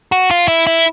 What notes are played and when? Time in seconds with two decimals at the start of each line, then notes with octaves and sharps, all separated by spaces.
0.12 F#4
0.31 F4
0.48 E4
0.67 E4